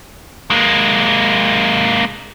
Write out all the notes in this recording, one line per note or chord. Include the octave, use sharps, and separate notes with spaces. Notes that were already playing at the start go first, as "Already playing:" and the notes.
G#3 A#3